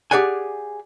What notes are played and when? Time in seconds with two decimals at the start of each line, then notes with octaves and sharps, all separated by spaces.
0.11 G4 G#4 D5 F#5 G#5